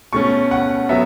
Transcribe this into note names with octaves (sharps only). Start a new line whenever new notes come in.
B2 A3 C#4 C#6
F#5
F#3 B3 E5